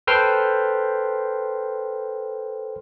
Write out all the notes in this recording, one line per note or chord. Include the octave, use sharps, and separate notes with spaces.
A4 B4 C5 G5 C6 F6